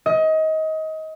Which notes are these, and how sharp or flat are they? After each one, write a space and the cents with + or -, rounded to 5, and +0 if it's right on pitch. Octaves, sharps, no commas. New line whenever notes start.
D#5 +25